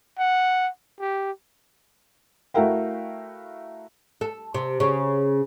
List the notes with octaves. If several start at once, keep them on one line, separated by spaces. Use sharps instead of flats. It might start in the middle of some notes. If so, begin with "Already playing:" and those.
F#5
G4
A3 E4 F#4 A#4 F5 G5
A4
C3
C#3